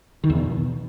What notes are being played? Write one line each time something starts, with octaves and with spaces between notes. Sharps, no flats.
D#3
E2
B2